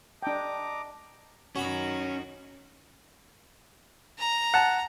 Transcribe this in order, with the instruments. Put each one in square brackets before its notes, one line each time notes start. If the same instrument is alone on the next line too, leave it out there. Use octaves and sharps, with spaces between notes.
[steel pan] D4 G5 [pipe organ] D#5 A#5 D6 [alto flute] A5
[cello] F#2 D#3 [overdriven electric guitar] C#4 [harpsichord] F#4 B5
[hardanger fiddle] A#5
[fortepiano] F#5 A5